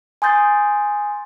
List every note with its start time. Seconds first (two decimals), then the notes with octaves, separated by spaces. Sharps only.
0.22 G#5 C6 D#6 G6 A6 C7